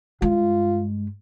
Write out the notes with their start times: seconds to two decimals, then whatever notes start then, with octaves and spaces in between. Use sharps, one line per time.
0.22 G2 G#3 F4